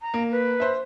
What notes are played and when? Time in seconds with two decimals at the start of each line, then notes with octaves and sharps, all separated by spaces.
0.01 A#5
0.14 A#3
0.31 B4
0.60 C5 E5